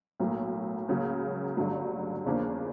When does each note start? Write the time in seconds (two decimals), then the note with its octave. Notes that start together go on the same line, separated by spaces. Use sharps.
0.20 B1 A2 F#3 A#3
0.88 C#2 C#3 F#3 A#3
1.57 G1 G2 D3 F#3 A3
2.26 E2 C#3 F3 A#3 D4